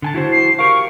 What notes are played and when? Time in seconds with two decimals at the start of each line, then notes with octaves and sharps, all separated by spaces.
0.02 D3 G#5 A5
0.14 E4 F#4 C5
0.32 C7
0.59 G4 A#4 F5 C#6